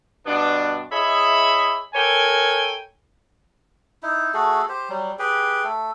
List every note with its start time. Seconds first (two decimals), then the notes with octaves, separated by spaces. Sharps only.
0.26 G2 B2 B3 D4
0.92 E4 G#4 C#5 D#5 E5 B5
1.94 A4 A#4 C#5 G5 G#5
4.03 D#4 E4
4.34 A3 F#4 G#4 A4
4.69 G4 C5
4.89 F#3 G3
5.19 G4 G#4 B4 G5
5.64 A3 A4